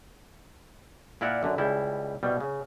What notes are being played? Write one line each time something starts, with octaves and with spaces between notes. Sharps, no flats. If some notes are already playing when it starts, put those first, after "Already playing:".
A#2 E4 A#4 D5 F#5
F#2 D3
C#2 G3 E4
C2 B2 G3
C#3